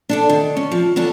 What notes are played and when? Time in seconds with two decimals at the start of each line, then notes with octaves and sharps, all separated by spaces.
0.09 D4 A4 D5
0.29 D#3
0.57 C#4
0.72 F3
0.96 F2 D3 C#4 D4 A5